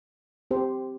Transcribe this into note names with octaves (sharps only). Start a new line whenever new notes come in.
C4 G4 C5